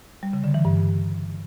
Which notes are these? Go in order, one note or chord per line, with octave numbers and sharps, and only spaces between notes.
G3
C#3
D3
E3
G2